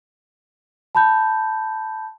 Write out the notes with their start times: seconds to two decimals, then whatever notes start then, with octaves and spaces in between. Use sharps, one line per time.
0.95 A5 B5 G6